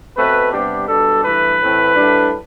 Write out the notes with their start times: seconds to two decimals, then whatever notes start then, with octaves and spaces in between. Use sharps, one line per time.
0.17 B2 A3 C4 B4
0.52 C3 G3 B3 D4 G4
0.88 B2 G3 D4 A4
1.24 G2 E3 A3 B4
1.60 A2 E3 A3 C4
1.95 A2 G3 D4